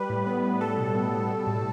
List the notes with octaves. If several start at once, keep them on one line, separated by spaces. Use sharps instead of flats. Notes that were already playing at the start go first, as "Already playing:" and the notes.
Already playing: G3 B4
A2
B3
A2
G3 A4
B2
B3
B2
G3
A2